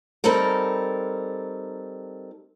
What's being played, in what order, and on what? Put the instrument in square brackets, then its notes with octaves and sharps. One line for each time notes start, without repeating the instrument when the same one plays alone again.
[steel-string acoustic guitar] G3 C4 D#4 A4 A#4